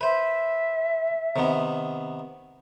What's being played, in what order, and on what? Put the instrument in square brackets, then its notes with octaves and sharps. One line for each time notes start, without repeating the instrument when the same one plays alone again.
[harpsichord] B4 C5 [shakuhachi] E5
[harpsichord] C3 D#3 B3